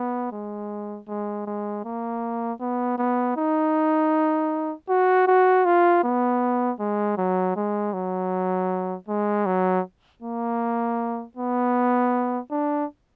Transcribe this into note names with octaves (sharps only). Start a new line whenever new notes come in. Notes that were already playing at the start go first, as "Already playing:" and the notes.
Already playing: B3
G#3
G#3
G#3
A#3
B3
B3
D#4
F#4
F#4
F4
B3
G#3
F#3
G#3
F#3
G#3
F#3
A#3
B3
D4